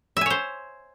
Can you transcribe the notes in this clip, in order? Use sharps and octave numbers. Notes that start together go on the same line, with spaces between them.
C5 C#5 E5 G#5